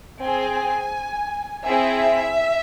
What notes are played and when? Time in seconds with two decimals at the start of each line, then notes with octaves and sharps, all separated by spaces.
0.21 C4 G#4 G#5
1.66 C4 E4 G#4 E5